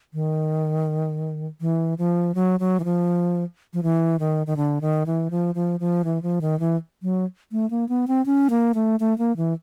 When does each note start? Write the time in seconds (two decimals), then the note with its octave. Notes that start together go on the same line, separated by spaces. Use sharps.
0.14 D#3
1.61 E3
1.98 F3
2.35 F#3
2.60 F#3
2.80 E3
2.84 F3
3.73 F3
3.83 E3
4.20 D#3
4.47 D#3
4.57 D3
4.81 D#3
5.06 E3
5.31 F3
5.55 F3
5.80 F3
6.04 E3
6.23 F3
6.41 D#3
6.60 E3
7.03 F#3
7.52 A3
7.70 A#3
7.89 B3
8.08 C4
8.26 C#4
8.50 A#3
8.75 A3
9.00 A3
9.18 A#3
9.37 E3